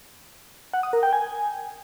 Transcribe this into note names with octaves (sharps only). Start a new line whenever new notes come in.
F#5
D#6
A#4
G5
G#5